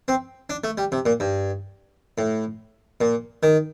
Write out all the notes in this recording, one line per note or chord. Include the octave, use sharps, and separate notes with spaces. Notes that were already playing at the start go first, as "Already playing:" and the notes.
C4
D4
A3
G3
C3
A#2
G2
A2
A#2
D#3